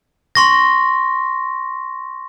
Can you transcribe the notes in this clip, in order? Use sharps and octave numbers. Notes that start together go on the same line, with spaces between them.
C6 C#6 A#6